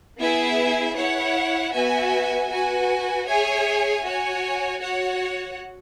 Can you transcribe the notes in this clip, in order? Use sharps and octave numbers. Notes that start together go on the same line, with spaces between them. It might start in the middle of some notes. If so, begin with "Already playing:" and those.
B3 E4 G#4 E5 G#5
E4 C#5 F#5
B3 F#4 B4 E5 G#5
F#4 B4 G#5
G#4 C#5 E5 G#5
F#4 C#5 G#5
F#4 C#5 F#5